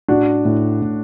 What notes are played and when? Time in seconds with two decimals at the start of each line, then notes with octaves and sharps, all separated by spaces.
0.08 A2 D4 F#4
0.45 A2
0.82 A2